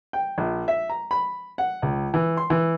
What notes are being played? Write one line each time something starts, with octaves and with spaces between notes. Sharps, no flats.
G5
A#1
E5
A#5
B5
F#5
C#2
E3
C6
E3